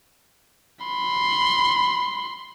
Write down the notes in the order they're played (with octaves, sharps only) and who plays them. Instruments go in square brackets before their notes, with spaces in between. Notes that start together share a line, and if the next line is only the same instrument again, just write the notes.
[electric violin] B5 C6